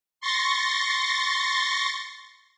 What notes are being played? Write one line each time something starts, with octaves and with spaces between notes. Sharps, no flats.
C6 C#6 A6 A#6